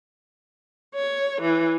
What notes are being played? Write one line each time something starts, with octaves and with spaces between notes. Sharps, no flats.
C#5
E3